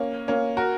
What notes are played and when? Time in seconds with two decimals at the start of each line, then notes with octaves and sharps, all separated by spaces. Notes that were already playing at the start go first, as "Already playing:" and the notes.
Already playing: A#3 C#4
0.28 A#3 C#4
0.57 F#4 A#4